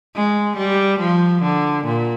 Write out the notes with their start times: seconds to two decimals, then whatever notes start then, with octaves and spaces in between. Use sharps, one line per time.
0.15 G#3
0.57 G3
1.00 F3
1.42 D3
1.85 A#2